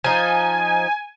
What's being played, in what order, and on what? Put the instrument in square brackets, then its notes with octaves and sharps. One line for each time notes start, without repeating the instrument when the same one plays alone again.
[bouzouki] F3 D#4 [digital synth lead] G#5